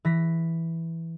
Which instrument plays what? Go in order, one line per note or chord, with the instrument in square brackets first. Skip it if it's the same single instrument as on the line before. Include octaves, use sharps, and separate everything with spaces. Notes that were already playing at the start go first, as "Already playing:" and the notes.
[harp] E3 A#6 B6